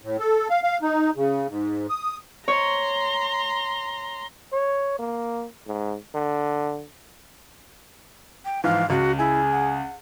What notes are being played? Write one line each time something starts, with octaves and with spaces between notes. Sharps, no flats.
A2
A4
F5
F5
D#4
C#3
G#2
D#6
C#5 A#5 C6
C#5
A#3
G#2
D3
G5
G#2 E3 F3 F5
C#2 F#4
E4 G#4
F#5